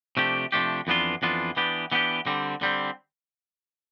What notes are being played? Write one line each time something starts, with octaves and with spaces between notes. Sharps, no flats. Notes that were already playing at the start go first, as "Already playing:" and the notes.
C3 F3 A3 D4 G4
C3 F3 A3 D4 G4
F2 E3 B3 D4 F4
F2 E3 B3 D4 F4
E3 B3 D4 G4
E3 B3 D4 G4
D3 G3 C4
D3 G3 C4